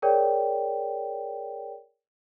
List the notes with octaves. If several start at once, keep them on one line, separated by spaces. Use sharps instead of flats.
G#4 A#4 C#5 D5 G5